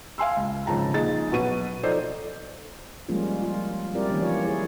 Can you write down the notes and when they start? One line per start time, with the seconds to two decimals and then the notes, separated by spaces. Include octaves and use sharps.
0.18 F5 G#5 C6 E6
0.37 C#2
0.67 G#1 C#3 F3 A5 A#5
0.94 A#1 F3 D#4 G#4 A6
1.32 B2 F#3 F#4 B4 D#7
1.83 F3 D#4 A4 C5 D5
3.08 F3 G3 G#3 A#3 C#4 F4
3.42 F4
3.94 G3 C4 E4 G4 A#4 D5
4.10 D#3 E3 A#3 C#4
4.22 F3 F4 C#5
4.45 E4 G#4 C#5